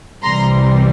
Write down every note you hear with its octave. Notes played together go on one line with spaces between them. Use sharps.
C2 C3 E3 G3 A#5 C6